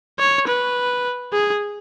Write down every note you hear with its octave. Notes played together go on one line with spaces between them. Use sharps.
C#5
B4
G#4